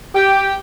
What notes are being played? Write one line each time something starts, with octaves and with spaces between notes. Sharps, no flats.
G4